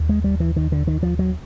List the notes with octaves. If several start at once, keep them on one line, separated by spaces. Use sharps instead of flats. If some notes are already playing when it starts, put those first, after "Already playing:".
Already playing: D#2
G#3
G3
E3
D#3
D3
D#3
F3
F#3